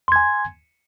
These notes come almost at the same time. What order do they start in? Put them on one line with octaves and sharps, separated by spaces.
C6 G#6 G#5